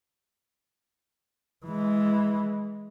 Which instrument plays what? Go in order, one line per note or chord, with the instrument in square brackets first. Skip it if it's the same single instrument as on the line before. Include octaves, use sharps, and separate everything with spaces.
[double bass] E3 G#3